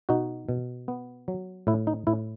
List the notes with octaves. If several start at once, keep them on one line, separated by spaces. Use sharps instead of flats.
B2 D#4 F#4
B2
B3
F#3
A2 E4
D#4
A2 E4